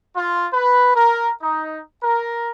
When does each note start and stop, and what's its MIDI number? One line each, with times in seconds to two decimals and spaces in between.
0.15 0.47 65
0.53 0.92 71
0.95 1.32 70
1.42 1.81 63
2.02 2.51 70